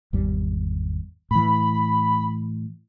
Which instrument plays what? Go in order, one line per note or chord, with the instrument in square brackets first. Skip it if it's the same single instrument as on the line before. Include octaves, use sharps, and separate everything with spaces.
[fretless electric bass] G#1 E2 G3
[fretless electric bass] A2 E3 [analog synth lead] B5